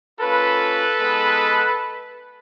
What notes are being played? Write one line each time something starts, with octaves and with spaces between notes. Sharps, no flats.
A#3 C#4 F4 A4 B4
G#3 B3 D#4